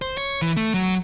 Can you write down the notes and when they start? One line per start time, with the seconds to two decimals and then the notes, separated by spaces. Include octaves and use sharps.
0.02 C5
0.17 C#5
0.42 E3
0.57 A3
0.74 F#3